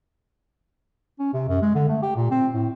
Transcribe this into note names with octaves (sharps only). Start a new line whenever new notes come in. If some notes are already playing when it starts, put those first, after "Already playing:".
C#4
C3
F#2
G#3
D3
A3
G4
A#2
C4
A2